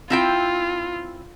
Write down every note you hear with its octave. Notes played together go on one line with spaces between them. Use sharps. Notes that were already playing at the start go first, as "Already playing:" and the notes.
C4 E4 F4 G5